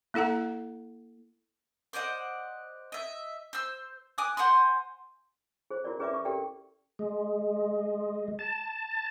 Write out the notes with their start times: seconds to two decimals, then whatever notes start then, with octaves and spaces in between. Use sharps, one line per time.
0.14 A#3 E4 A4 F#5 A#5
1.93 C5 D5 D#5 F#5
2.92 D#5 E5
3.53 C5 E6
4.18 G#5 D6 D#6 F#6
4.37 C5 F#5 G#5 C6
5.70 G#4 C5
5.84 E4 F#4 A#4 D5
5.99 C#4 G#4 B4 D5 E5 D6
6.12 G#4 C#6 D6
6.25 G4 A4 A#4 D5 G5
6.99 G#3
8.39 A5